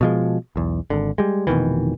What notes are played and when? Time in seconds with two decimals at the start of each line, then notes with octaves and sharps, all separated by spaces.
0.01 B2 F3 G#3
0.56 B1 E2
0.90 G#1 D3
1.18 G3 G#3
1.47 F1 B2 D#3 E3